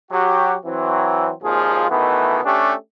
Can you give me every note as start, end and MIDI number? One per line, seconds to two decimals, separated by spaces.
0.11 0.55 54
0.11 0.55 66
0.11 0.55 67
0.65 1.30 52
0.65 1.30 54
0.65 1.30 60
1.42 1.87 32
1.42 1.87 39
1.42 1.87 46
1.42 1.87 53
1.42 1.87 65
1.42 1.87 68
1.89 2.39 47
1.89 2.39 51
1.89 2.39 52
1.89 2.39 57
1.89 2.39 59
2.44 2.72 57
2.44 2.72 61
2.44 2.72 62
2.44 2.72 67